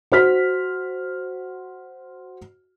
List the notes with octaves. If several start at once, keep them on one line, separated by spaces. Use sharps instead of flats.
F#4 C5 F6 B6